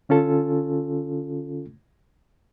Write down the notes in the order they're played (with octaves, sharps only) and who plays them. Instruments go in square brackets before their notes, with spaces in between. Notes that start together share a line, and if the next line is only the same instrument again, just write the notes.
[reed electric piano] D3 C#4 F4 A4